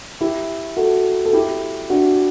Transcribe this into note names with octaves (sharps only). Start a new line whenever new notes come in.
E4 G4
F#4 A4
A4
E4 G4
D4 F#4